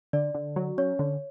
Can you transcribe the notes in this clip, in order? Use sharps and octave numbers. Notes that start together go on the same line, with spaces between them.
D3 D5
D3
F#3
C#4 C#5
D3